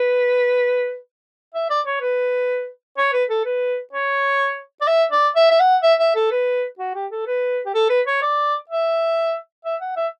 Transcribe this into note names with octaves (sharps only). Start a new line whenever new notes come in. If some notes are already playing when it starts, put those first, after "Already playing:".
Already playing: B4
E5
D5
C#5
B4
C#5
B4
A4
B4
C#5
D5
E5
D5
E5
E5
F#5
E5
E5
A4
B4
F#4
G4
A4
B4
G4
A4
B4
C#5
D5
E5
E5
F#5
E5